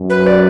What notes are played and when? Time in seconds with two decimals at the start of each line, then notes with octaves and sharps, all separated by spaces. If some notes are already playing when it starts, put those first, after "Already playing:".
Already playing: F#2
0.10 B4
0.27 D5